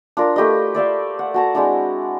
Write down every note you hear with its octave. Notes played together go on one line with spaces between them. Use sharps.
D4 F4 A#4
A3 G4 B4 D#5
D5 E5 F5 G5
F#5
F#4 A5 A#5
G#3 C4 D4 E4